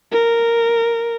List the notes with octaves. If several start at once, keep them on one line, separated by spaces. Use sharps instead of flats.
A#4